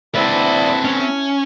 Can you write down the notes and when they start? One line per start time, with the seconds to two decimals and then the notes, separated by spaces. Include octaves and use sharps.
0.15 C4 E4 A4 B4 D5 E5
0.85 C#4